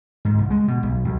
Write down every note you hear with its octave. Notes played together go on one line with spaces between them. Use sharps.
G#2
C2
G#3
B2
B1
B1